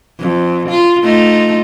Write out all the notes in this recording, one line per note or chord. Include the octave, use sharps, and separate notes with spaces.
F2
F4
A3 D#4 F4